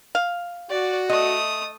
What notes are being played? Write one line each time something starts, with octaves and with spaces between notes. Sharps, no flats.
F5
F#4 D5
A3 D#5 D#6